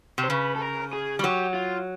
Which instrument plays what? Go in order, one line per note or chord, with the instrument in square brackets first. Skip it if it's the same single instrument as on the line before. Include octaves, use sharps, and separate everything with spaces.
[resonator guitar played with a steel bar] C3
[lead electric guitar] C5
[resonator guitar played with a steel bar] C#3 [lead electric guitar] B4
[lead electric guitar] A4
A#4
G#4
[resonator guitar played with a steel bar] G3
[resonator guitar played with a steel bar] F#3 [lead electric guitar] G4
[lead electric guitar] F4